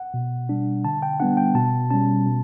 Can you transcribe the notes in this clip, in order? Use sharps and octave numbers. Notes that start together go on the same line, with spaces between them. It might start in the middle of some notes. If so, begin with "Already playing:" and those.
Already playing: F#5
B2
G3 D4
D3 A5
G5
G3 B3 D4 F#5
G5
B2 A5
G3 C#4 A5
B2